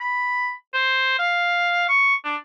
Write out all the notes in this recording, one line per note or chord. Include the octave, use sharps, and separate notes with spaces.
B5
C5
F5
C#6
D4